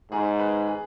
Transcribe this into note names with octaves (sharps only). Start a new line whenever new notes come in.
G#2 G#4
B4
G#4